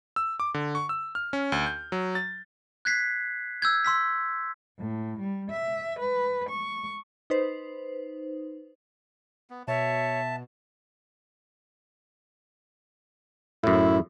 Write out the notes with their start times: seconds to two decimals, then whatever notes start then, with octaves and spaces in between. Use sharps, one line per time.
0.16 E6
0.40 D6
0.54 D3
0.75 C#6
0.89 E6
1.15 F6
1.33 C#4
1.52 D2
1.66 G6
1.92 F#3
2.15 A6
2.85 F#6 G#6 B6 C7
3.62 E6 G6 G#6
3.85 C6 E6 B6
4.78 A2
5.19 G3
5.51 E5
5.99 B4
6.48 C#6
7.30 D#4 B4 C5
9.50 B3
9.68 B2 C#5 E5 A5
13.64 F#2 A2 E4